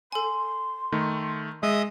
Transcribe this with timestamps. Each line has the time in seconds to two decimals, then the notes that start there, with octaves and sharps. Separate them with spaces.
0.12 A4 G#5 C6
0.92 D#3 A3
1.63 G#3 D#5 E5 D#6